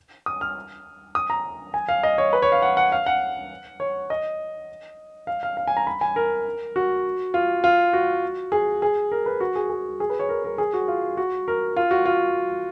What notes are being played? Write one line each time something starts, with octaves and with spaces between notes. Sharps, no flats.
D#6
F6
D#6
A#5
G#5
F5
D#5
C#5
B4
C#5
F5
F#5
F#5
F5
F#5
C#5
D#5
F5
F5
F5
G#5
A#5
B5
G#5
A#4
F#4
F4
F4
F#4
G#4
G#4
A#4
B4
F#4
G#4
G#4
G#4
B4
C#5
A#4
A#4
G#4
F#4
F4
F#4
A#4
F4
F#4
F4